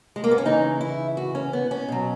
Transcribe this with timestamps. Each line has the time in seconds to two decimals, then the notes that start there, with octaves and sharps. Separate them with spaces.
0.16 G#3
0.24 A#3
0.31 B3
0.38 C#4
0.45 C#3 E3 D#4
0.81 E4
1.17 F#4
1.35 C#4
1.53 B3
1.71 C#4
1.88 B2 F#3